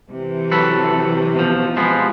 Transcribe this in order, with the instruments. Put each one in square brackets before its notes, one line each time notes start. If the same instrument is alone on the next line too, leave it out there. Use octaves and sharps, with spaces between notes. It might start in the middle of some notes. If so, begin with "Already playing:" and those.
[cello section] C3 E3
[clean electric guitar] F#3 A4 B4
B2 F3
F3 G#3 B3